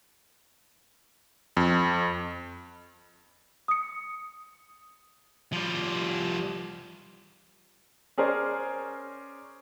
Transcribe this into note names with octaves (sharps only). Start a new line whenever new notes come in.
F2
D#6 C#7
F3 G3
C#4 G#4 A#4 C5 D5